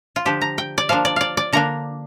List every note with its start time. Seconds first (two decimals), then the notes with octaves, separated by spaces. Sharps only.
0.16 F4
0.25 D3 F3 D4 G4
0.42 A#5
0.58 G5
0.78 D5
0.89 F3 A#3 D4 F5
1.05 D5
1.16 D5 F5
1.37 D5
1.53 D3 A#3 D4 A#5